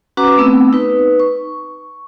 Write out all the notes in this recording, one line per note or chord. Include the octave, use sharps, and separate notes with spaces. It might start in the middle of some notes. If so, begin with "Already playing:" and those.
C#4 F#4 B4 F#5 A#5 D6
A3 B3 C4 E6
D#4 B4
C#6